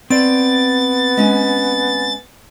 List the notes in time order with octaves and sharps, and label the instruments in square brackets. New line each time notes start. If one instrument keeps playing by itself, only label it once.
[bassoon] B3 [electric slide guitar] C4 D5 [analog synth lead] A6
[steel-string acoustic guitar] G#3 C#4 G#5